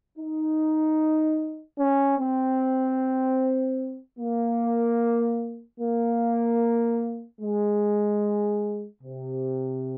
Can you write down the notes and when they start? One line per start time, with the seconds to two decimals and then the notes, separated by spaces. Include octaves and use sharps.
0.17 D#4
1.78 C#4
2.18 C4
4.18 A#3
5.79 A#3
7.40 G#3
9.01 C3